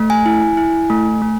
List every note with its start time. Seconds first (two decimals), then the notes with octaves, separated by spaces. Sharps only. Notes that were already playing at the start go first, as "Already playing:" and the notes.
Already playing: A3
0.10 G#5
0.26 E4
0.57 E4
0.90 A3
1.22 A3